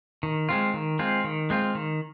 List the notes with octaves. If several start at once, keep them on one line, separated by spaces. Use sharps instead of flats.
D#3
G#3 C4 F4
D#3
G#3 C4 F4
D#3
G#3 C4 F4
D#3